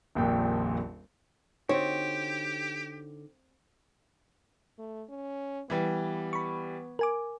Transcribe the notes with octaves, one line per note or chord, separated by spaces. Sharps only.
D#1 A#1 F2 A#2 G5
D3 C4 D#4 F#4 G4 C#5
A3
C#4
E3 G3 B3
B5 C#6
A#4 G#5 D6